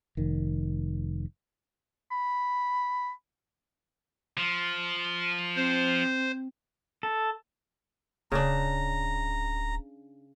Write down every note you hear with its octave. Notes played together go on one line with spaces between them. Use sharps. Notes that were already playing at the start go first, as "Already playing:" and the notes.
F1 D#3
B5
F3
C4 C5
A4
D1 C#3 D4 A#5